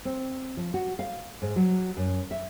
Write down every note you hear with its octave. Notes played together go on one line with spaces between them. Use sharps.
C4
F3
F#4
F5
G#2
F#3
F#2
E5